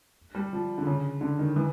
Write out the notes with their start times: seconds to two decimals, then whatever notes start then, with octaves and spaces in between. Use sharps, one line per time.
0.35 G3
0.53 F3
0.78 D3
0.87 C#3
1.21 D3
1.39 D#3
1.56 E3